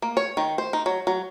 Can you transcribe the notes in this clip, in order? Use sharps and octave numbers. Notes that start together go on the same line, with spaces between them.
A#3
C#5
D#3
C5
D#4
F#3
F#3